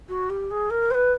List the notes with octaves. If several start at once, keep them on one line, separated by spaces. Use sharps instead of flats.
F#4
G4
G#4
A#4
C5
B4